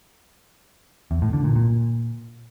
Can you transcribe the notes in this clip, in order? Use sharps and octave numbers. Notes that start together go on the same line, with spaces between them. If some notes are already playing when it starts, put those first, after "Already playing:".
E2
A2
D3
A#2
A#2